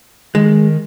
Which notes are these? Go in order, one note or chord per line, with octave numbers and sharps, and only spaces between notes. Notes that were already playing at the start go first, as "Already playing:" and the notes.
D#3 G#3